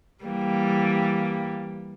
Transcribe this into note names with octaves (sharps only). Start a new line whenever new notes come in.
E3 G3 A#3